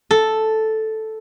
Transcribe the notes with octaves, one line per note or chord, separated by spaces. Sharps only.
A4